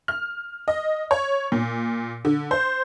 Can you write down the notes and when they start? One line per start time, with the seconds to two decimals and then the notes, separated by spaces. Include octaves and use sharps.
0.08 F6
0.68 D#5
1.11 C#5
1.52 A#2
2.25 D3
2.51 C5